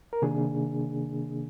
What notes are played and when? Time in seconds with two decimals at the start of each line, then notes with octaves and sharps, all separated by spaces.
0.13 A#4
0.22 C3 D#3 A#3 D4 G#4